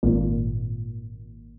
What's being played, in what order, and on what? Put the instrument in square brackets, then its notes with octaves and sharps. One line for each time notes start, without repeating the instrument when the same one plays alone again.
[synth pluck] G#1 A#2